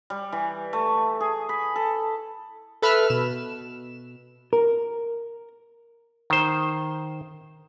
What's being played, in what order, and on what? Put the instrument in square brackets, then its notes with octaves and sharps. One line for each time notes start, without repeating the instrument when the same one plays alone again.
[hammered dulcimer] G3
E3
A3
G#4
B5
A4
[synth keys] A4 B4 E5 B5 E6 F6
B2 E7
[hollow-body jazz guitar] A#4
[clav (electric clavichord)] D#3 C5